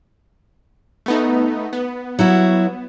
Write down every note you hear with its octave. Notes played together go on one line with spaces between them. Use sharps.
A3 B3 D#4
B3
F#3 E4 F#4